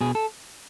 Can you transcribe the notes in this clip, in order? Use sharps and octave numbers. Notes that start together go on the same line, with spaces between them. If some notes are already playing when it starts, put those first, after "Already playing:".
B2 G#4
A4